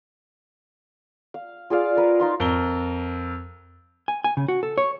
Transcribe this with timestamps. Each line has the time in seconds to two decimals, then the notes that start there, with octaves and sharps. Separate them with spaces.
1.34 F5
1.70 F4 G#4 D5 F5
1.97 A#4 B4 F5
2.20 D#4 F4 C6
2.40 F2 A#4 G7
4.08 G#5
4.24 G#5
4.37 C#3
4.48 F#4
4.63 A4
4.78 C#5